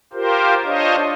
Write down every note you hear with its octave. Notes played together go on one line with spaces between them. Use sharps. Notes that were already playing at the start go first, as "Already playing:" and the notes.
F4 G4 A#4 C5
D4 F4 C5 C#5 D#5